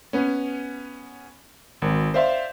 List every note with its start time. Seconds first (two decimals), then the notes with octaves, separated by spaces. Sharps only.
0.13 B3 C#4
1.82 G#1
2.14 C5 D5 E5 F5 C6